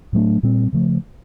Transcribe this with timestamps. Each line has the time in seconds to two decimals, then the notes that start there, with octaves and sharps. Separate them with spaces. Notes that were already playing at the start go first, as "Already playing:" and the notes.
0.13 A2 F#3 A3 D4
0.43 A#2 G3 C4
0.73 C#3 F3 A3